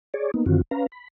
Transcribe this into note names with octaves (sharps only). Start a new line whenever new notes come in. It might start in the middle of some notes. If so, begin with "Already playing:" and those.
G#4 C#5 D5
A#3 B3 D#4
F#2 D3 D#3 C4 F4 F#4
C#4 B4 F5 A#5
B5